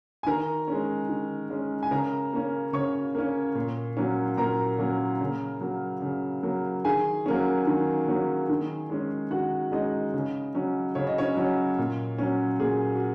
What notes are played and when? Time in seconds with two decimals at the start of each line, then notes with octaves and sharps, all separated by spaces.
0.23 G#5
0.26 D#3 A#4 A#5
0.68 G#3 C#4
1.09 D#3
1.50 G#3 C#4
1.83 G#5
1.91 C#3 A#4 A#5
2.33 A#3 C#4
2.73 C#3 C#5 C#6
3.15 A#3 C#4
3.55 A#2
3.97 F#3 A#3 C#4
4.37 A#2 A#4 A#5
4.79 F#3 A#3 C#4
5.21 C#3
5.61 F#3 A#3
6.02 C#3
6.43 F#3 A#3
6.85 D#3 G#4 G#5
7.26 F#3 A#3 C#4
7.67 D#3
8.08 F#3 A#3 C#4
8.50 D#3
8.90 G#3 C#4
9.31 D#3 F#4 F#5
9.72 G#3 C#4 D#4 D#5
10.14 C#3
10.55 F#3 C#4
10.95 C#3 C#5
11.07 D#5
11.18 C#4 C#5
11.37 F#3 C#4
11.78 A#2
12.18 F#3 C#4
12.60 A#2 G#4
12.95 F#4